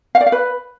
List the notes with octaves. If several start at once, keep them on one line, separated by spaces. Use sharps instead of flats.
F5
D5
F5
B4